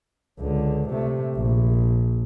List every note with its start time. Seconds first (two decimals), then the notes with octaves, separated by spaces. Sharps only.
0.39 C#2 D3
0.89 C3 A3
1.36 A#1